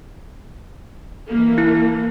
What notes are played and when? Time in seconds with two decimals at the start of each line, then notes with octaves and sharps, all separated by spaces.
1.28 E3 A#3
1.58 E4